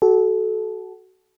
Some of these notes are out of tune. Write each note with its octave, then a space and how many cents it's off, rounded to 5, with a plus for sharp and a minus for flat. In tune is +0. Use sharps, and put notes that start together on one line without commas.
F#4 +20 A4 -20